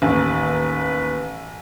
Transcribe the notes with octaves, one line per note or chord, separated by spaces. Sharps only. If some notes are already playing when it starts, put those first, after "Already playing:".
A1 D#2 B3 B4